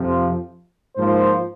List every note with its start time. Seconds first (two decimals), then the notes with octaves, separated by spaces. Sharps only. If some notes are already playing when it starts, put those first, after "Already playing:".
Already playing: F2 C3 F3
0.96 G#2 F3 A#3 F4 C5